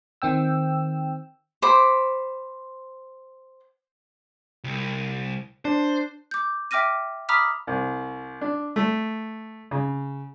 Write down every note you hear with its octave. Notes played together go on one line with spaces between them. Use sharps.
D#3 C4 G5 E6
C5 B5 D6
C2
D4 C5
D6 G6
E5 G5 D6 F6 A#6 D#7
A#5 B5 D6 D#6 F6 B6
C2
D4
A3
C#3